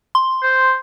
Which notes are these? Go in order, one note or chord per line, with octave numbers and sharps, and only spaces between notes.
C6
C5